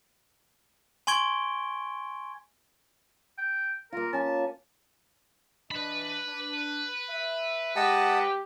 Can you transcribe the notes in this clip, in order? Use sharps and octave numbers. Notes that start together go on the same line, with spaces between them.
G#5 C6 C#6 G#6 D7 G7
G5
A#3 F4 A#4
C#4 G#5 A5 C#6
E3 D4 B4 D#5 B5
D4
E5
G#3 G4 D#5 F#5 A5